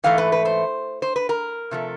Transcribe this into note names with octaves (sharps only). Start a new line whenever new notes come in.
G#2 E3 A3 F5
B4
B4
C5
C5
B4
A#4
C3 F3 A3